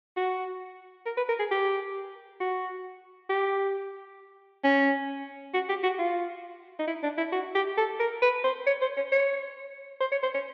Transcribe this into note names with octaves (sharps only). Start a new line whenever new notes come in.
F#4
A#4
B4
A#4
G#4
G4
F#4
G4
C#4
F#4
G4
F#4
F4
D#4
E4
D4
E4
F#4
G4
A4
A#4
B4
C5
C#5
C5
C#5
C#5
C5
C#5
C5
C#5